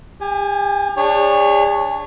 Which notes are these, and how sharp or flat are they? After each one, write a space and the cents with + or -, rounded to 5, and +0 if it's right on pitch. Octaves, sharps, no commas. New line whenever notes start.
G4 +40 G#5 +0
D4 +0 G#4 -40 C#5 +0